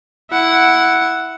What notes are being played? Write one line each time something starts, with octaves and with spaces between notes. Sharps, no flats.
E4 F#5